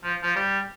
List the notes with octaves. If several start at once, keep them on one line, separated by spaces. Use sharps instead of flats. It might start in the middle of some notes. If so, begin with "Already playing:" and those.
F3
F3
G3